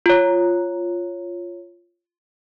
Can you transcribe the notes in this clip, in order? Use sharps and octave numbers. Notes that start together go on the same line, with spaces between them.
F4 C#5